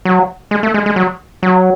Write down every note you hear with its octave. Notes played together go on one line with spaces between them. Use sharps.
F#3
G#3
A3
G#3
G#3
F#3
F#3